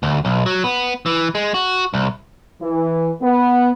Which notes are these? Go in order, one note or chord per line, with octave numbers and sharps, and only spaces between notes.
D2
B1
F#3
B3
E3
G#3
F#4
C2
E3
B3